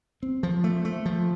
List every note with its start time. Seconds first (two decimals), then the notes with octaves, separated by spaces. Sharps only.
0.23 C4
0.43 F3
0.64 A3
0.85 A3
1.06 F3